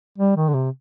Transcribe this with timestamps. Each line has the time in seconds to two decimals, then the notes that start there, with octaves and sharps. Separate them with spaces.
0.18 G3
0.36 D#3
0.49 D3
0.54 C3